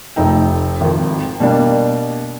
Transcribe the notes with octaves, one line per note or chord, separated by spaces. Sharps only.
F1 A3 D#4 G5
G#1 F2
B2 G3 A#3 D4